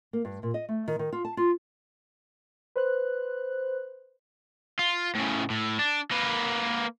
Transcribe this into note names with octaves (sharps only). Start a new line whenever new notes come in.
A#3
G2
A#2
D#5
A3
D#3
D#3
F4
A5
F4
B4 C5 F#6
F4
A2 C#3
A2
D4
A#3 B4